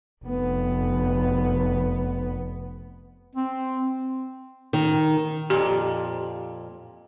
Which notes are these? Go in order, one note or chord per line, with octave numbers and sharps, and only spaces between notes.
F1 B3
C4
D#3
F2 A#2 G4